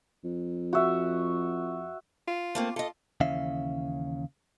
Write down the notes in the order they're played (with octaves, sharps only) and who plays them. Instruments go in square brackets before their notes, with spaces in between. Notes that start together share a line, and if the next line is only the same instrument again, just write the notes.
[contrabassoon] F2
[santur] F#4 E5
[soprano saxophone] F4
[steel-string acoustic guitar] A3 A#3 C4
[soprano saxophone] F4 [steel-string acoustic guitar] A4 D#5
[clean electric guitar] D#2 C#3 E3 C#4 E5 F5